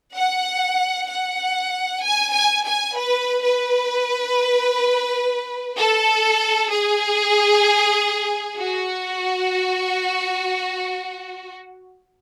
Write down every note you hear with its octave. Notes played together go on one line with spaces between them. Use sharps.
F#5
F#5
G#5
G#5
G#5
B4
B4
A4
G#4
F#4